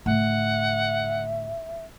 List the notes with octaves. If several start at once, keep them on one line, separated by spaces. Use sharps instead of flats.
A2 D3 E5 F#5